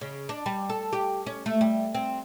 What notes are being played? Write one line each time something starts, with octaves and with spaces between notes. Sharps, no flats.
C#3
D4
G3
A4
G4
C#4
A3
G3
C4